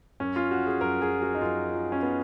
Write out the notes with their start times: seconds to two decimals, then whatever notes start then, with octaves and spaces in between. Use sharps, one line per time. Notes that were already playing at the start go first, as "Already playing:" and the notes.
0.20 F#2 C#4
0.36 F4
0.51 F3 F#4
0.67 G#4
0.81 F#2 A#4
1.02 G#4
1.12 F3
1.22 F#4
1.35 D#4
1.42 F#2 F4
1.72 F3
1.92 C#4
2.02 B3